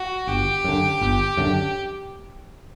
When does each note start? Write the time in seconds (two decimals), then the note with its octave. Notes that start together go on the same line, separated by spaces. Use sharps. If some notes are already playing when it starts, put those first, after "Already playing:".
Already playing: F#4
0.27 G1 G4
0.64 F#2 D3
1.01 G1
1.37 F#2 D3